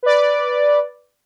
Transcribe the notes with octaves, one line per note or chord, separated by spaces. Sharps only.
B4 D5